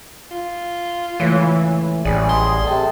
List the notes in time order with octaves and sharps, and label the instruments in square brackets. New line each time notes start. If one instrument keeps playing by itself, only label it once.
[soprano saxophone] F4
[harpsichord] C#2 A2 [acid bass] E3
[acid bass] A1 [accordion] G3 G#4 [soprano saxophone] D5
[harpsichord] D#5 [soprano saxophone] C6
[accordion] C3 C4 [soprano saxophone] A4